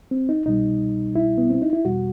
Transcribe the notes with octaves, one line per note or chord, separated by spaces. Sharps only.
C4
D#4
C2 B2 G3 D#4
E4
B3
C4
D#4
E4
E2 B2 G3 F#4